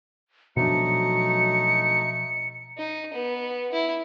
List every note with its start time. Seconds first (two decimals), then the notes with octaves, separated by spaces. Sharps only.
0.57 B2 F3 F#3 A3 D4 D#4 C#7
2.78 D#4
3.14 B3
3.72 E4